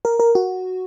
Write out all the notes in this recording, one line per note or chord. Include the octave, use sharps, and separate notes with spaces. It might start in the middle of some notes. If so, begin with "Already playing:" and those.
A#4
A#4
F#4